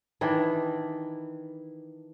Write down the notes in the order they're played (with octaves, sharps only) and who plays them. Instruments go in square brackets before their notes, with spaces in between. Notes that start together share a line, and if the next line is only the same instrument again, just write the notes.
[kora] D#3 E3 D4